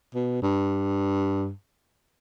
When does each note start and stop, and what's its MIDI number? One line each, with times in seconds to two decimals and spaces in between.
0.14 0.41 47
0.42 1.51 43